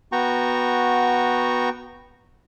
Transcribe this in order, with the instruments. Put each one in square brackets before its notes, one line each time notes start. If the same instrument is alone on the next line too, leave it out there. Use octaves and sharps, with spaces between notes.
[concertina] B3 F#4 G5 A#5 C#6